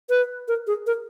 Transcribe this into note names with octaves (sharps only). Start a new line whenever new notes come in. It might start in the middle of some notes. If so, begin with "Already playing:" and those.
B4
A#4
G#4
A#4